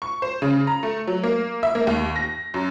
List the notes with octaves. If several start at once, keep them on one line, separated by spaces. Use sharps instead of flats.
C#6
C5
C#3
A#5
A3
F#3
A#3
E5
A#3
D#2
A#6
F#2